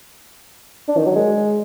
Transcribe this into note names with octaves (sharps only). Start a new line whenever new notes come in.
D4
D#3
F#3
G#3